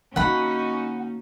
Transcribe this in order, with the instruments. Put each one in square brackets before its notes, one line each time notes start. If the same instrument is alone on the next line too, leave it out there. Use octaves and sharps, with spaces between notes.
[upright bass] D3 A#3 [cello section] C#4 D#4 F#4 [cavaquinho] F#5 B5